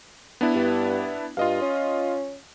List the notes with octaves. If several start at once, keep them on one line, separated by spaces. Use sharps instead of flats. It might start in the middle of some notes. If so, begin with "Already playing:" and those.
B3 D4 E4
G2
G2 F4 D#5 F5
C#4